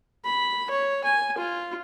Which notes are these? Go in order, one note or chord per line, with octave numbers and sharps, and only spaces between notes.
B5
C#5
G#5
F4